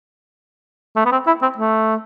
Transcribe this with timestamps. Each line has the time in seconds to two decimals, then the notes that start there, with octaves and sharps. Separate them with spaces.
0.96 A3
1.06 B3
1.12 C4
1.27 E4
1.42 C4
1.58 A3